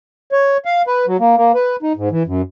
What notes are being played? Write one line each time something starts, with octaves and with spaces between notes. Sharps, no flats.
C#5
F5
B4
F#3
A#3
A#3
B4
D#4
G#2
E3
F#2